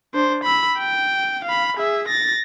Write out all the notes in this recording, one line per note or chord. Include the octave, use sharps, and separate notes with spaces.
D4 C5
B5 E6
G5
F5 B5
G#4 E5
A6 A#6